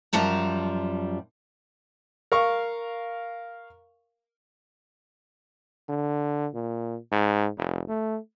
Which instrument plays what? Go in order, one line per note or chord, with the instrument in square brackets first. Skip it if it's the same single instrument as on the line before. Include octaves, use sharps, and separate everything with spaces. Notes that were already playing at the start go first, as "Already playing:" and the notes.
[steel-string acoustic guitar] F#2 F3 G3 A5 A#5
[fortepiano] A#4 F5 C#6
[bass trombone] D3
A#2
G#2
F1
A3